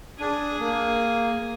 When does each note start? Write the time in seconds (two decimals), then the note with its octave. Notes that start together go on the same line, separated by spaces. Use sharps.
0.20 D4 G#4
0.60 A#3